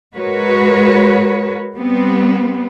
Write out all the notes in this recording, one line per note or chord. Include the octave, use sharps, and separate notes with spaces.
G#3 F#4 A#4 B4 C#5
G3 B3 C4